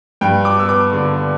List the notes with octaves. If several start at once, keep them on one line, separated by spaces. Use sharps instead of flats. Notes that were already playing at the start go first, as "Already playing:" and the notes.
G2 G5
D6
B3 E6
D6
D3